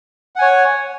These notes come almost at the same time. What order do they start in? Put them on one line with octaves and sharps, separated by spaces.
F#5 G#5 C#5